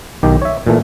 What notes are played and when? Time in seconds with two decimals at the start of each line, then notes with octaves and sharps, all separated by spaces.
0.23 B1 D#3 G4
0.42 C#5 E5
0.67 A#2 E3 A3